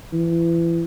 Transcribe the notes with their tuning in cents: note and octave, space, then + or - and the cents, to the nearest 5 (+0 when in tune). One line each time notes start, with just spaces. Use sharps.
E3 +30